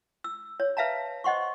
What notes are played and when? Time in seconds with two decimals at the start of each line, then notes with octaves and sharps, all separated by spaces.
0.24 E6
0.60 C#5
0.77 B4 E5 F5 A5 A#5
1.24 C5 D#5 F#5 C6 C#6